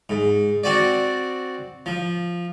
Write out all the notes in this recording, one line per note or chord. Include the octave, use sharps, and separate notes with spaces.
G#2
C4 F#4 D5
F3